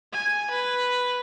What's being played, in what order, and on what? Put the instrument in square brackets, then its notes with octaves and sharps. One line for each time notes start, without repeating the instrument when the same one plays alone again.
[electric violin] G#5
B4